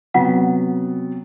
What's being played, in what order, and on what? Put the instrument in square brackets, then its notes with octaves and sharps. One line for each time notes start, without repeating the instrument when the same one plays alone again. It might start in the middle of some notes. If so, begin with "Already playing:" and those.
[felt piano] C3 F#3 B3 [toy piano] F4 F#5